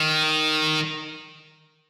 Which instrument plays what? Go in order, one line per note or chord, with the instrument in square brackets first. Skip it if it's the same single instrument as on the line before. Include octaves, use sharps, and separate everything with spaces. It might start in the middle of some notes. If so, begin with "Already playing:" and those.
Already playing: [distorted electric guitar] D#3